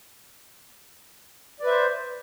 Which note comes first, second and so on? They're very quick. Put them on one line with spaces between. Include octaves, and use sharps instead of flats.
D5 B4 E5 C5